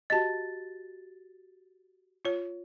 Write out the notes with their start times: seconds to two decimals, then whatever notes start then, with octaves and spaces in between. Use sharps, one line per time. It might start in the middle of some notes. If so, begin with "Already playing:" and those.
0.10 F#4 G4 D#5 A5 A6
2.25 F4 C#5